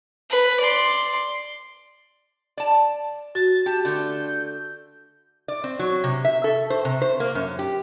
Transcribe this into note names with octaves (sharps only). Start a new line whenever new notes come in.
B4
D5 C6
D5 A5
F#4 A6
G4 A5
D3 A3 G6
D5
C4
F#3
C3
E5
A4
C5
C3
C5
A#3
F#2
G4